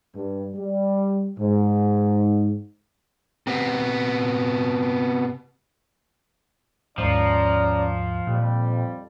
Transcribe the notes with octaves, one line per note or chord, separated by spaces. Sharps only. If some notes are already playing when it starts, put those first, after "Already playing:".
G2
G3
G#2
C3 B3
D#2 G#2 F3 C#4 D5 A#5
F2 A#2 G3